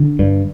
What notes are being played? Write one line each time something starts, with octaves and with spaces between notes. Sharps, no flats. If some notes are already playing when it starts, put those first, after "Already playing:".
Already playing: D3
G2